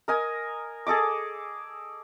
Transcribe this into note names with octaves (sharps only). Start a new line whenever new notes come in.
A#4 D#5 G#5
G#4 A4 D#5 D6